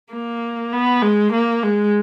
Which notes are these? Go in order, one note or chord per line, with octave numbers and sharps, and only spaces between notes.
A#3
B3
G#3
A#3
G#3